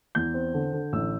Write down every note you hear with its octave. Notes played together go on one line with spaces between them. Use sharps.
E2 G6
C4
D3
D3
A1 E6